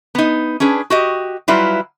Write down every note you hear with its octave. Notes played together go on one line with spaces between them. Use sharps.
B3 D#4
C#4 D4 G#4 B4
F#4 G4 D#5
F#3 G3 E4 F4 B4